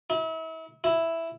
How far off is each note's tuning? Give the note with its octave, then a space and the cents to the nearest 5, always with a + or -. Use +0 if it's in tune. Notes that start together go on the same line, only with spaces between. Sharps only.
E4 -40
E4 +0